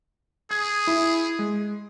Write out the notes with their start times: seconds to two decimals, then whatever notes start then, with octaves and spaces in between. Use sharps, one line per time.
0.51 G#4 G#6
0.87 E4
1.39 G#3